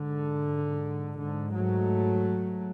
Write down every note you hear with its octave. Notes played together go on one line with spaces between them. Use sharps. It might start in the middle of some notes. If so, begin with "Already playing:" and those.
Already playing: G#2 D3
G#2 D3
F#3 A3